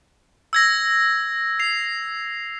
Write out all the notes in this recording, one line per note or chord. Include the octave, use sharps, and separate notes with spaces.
E6 G#6 A#6
C7 F7